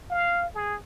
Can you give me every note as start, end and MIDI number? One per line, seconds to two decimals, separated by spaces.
0.11 0.47 77
0.55 0.76 68